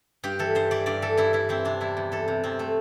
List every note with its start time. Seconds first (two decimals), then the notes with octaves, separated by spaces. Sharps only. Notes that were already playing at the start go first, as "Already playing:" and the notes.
0.24 G2 G4
0.39 E3 A4
0.55 G2 C5
0.71 E3 D5
0.86 G2 D5
1.02 E3 A4
1.17 G2 E4
1.33 E3 E4
1.49 E3 C4
1.65 C3 D4
1.81 E2 E4
1.97 E2
2.12 E3 A4
2.28 C3
2.44 E2 C4
2.59 A3